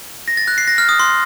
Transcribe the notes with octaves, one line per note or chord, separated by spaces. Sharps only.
A#6
A6
F#6
C7
A#6
F6
D#6
C6